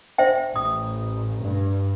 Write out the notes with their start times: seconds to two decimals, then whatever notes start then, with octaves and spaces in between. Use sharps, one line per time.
0.18 C5 E5 G5
0.56 A1 D#6
1.42 G2